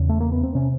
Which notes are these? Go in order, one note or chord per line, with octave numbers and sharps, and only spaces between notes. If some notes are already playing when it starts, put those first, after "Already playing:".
Already playing: E2 C#3
A3
A#3
B3
C4
C3 C#4